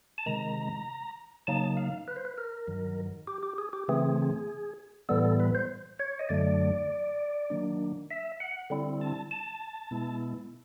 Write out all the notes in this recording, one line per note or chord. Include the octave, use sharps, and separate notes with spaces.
A5
C3 D#3 G#3 A#5
C#3 F#3 A#3 D#4 A5
F5
B4
C5
B4
A#4
G2 D#3 F#3
G4
G4
G#4
G4
C#3 E3 A3 C4 G#4
A2 E3 G3 B3 A4
A4
B4
C5
C#5
D#5
F#2 D3 F#3 A3 D5
D#3 F#3 A#3 D4
E5
F#5
D3 G3 C4 E4
A5
A5
B2 G#3 B3 E4